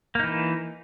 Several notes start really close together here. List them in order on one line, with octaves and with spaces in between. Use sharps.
A#3 D#4 E3